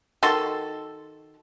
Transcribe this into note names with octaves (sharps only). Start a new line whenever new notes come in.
D#3 F#4 A4 C6